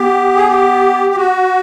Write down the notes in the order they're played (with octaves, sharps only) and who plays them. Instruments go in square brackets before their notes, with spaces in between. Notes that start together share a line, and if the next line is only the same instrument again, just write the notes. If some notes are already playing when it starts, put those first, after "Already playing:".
Already playing: [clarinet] B3 [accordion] G4
[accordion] G#4
G4
G4
F#4